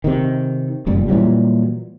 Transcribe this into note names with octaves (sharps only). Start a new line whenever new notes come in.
C3 D#3
F1 F#2 A#2 G3
A#2 E3 F#3 G3